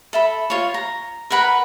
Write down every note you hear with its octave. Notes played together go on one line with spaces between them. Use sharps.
A4 E5 B5
F4 C#5
A#5
A#4 B4 F#5 B5